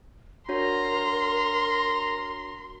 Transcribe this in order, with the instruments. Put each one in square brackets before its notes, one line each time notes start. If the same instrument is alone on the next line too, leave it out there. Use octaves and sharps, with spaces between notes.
[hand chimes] D4 F#4 C#5 [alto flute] A#4 [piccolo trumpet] A#5 [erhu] C6